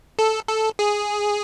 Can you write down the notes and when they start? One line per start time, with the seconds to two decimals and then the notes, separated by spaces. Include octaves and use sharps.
0.19 A4
0.48 A4
0.79 G#4